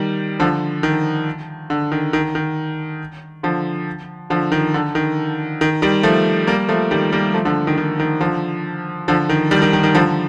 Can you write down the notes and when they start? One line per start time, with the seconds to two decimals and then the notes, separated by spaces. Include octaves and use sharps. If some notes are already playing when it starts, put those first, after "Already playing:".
Already playing: D#3 G3
0.40 D3 F3
0.83 D#3
1.70 D3
1.92 D#3
2.13 D#3
2.35 D#3
3.43 D3 F3
4.30 D3 F3
4.52 D#3
4.74 D3
4.95 D#3
5.61 D#3
5.82 D#3 G3
6.03 F3 A3
6.47 G3 A#3
6.69 F3 A3
6.91 D#3 G3
7.12 G3 A#3
7.34 F3 A3
7.45 D3 F3
7.67 D#3
7.78 D#3
8.00 D#3
8.20 D3 F3
9.08 D3 F3
9.29 D#3
9.51 D#3 G3
9.62 D#3
9.73 D#3
9.83 D#3
9.95 D3 F3